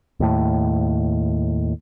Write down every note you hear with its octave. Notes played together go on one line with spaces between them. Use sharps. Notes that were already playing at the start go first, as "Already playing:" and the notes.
D#2 A2